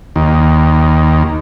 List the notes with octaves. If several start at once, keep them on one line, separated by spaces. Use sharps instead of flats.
D#2